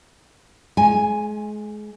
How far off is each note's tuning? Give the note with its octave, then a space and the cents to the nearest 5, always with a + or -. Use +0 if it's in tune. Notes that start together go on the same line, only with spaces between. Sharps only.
G#3 +30 G#5 +0